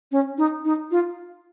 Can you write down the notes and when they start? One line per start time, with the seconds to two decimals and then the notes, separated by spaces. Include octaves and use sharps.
0.12 C#4
0.38 D#4
0.65 D#4
0.91 F4